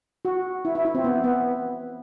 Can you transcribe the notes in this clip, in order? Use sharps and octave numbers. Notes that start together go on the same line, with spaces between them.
F#4
E4
E4
E4
C4
B3
B3